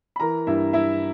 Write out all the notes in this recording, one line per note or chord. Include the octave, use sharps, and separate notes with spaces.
B5
E3 A#4 A#5
G2 E4 E5
G2 E4 E5